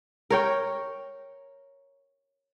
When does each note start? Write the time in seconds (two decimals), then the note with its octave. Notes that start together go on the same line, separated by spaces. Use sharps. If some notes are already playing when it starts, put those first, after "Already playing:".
0.30 A#4 C#5 G5